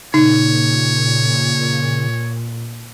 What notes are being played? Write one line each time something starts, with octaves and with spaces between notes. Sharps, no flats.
A#2 C#3 D#4 C#5